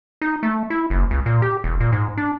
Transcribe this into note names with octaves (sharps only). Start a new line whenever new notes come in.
D#4
A3
E4
F#1
C#2
A#2
G4
E1
A#2
G#2
D4